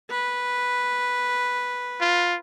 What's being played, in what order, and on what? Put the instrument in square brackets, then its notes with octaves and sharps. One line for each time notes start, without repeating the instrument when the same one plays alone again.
[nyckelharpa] B4
[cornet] F4